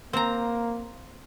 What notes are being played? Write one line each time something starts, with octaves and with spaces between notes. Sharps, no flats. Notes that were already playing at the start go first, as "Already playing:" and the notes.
A#3 C4 A#5